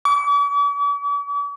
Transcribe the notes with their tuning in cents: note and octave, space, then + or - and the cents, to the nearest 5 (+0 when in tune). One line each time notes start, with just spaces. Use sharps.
D6 -45